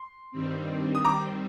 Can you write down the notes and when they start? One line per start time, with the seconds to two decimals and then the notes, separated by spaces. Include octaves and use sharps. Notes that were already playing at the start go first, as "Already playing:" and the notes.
Already playing: C6
0.32 G2 D#3 G3 C4
0.95 D#6
1.05 D#3 G3 C4 A#5 D6